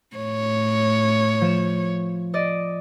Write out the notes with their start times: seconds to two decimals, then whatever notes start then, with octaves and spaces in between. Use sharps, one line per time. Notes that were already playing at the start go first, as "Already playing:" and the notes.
0.16 A2 C#5
1.41 F3 E7
2.34 D5 D#5